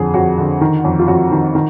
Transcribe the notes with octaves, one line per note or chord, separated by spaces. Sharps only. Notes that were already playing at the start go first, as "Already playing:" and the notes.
Already playing: F2 D3 G#4
F2 F#4
D3
D#3
F2
F4
F2 F#4
D#3
D#3